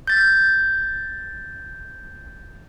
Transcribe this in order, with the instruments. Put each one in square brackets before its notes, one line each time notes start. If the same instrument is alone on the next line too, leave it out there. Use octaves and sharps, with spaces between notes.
[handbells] G6 A6